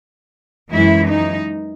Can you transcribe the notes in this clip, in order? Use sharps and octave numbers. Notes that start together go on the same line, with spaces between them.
F#2 E3 G#3 E4
D#4